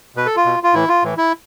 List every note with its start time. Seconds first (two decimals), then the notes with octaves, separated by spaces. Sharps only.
0.16 B2 B4
0.26 A4
0.36 F4
0.45 B2
0.63 F4
0.74 A2 E3 E4
0.88 F4
1.03 A2 E3
1.17 E4